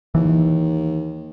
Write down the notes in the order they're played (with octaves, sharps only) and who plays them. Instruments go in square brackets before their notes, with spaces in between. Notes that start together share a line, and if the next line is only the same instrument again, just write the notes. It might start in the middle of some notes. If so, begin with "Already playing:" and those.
[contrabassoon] D#2 [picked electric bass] E3